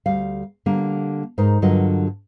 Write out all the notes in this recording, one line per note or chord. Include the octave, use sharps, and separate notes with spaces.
D2 G3 F5
D3 G3 A#3
G#2 D#4 A#4 C5
G2 D3 F#3 F4 A#4 D#5